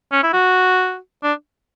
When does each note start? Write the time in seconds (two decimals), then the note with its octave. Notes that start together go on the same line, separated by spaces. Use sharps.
0.12 C#4
0.23 E4
0.33 F#4
1.23 D4